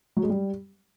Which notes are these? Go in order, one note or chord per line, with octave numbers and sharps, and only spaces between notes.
F#3
G#3
G3